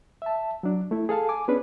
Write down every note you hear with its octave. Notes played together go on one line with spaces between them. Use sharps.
E5 A5
F#3 D4
A3 E4
G#4 A4 F5 A5
G#5 D6
B3 C#4 D4 G#4 B4